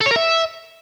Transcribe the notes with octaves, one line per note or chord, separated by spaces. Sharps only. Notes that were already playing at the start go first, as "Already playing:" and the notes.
A4
C#5
A#4
E5